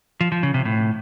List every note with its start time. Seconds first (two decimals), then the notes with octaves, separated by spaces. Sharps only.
0.21 F3
0.32 F3
0.43 C#3
0.54 C3
0.65 A2